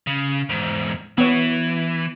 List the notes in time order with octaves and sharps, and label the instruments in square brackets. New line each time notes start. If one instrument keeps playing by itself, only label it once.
[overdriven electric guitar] C#3
E2 G#2
[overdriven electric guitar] E3 [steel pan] B3 C#5